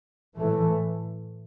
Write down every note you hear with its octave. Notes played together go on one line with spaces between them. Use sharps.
A2 E3 A3